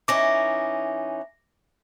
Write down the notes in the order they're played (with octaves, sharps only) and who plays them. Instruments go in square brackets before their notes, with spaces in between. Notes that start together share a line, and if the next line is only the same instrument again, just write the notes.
[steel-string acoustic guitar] E3 C#4 D#4 [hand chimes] D6 A#6